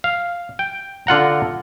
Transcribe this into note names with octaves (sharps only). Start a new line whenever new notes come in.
F5
G5
D3 F4 F#5 A#5